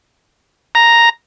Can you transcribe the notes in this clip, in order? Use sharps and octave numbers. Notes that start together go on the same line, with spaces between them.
A#5